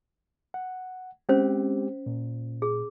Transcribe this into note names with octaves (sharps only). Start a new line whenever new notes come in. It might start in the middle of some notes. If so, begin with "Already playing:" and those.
F#5
G#3 C4 C#4 G4 C5
A#2
G#4